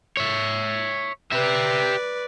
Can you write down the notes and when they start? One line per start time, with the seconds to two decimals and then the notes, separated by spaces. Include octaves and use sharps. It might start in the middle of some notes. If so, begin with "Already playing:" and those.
0.17 C#5 E5
1.32 G4 B4 D5 E5